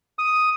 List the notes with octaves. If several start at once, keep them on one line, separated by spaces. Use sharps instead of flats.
D#6